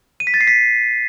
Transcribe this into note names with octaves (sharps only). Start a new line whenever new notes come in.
D#7
B6
A6
C7
B6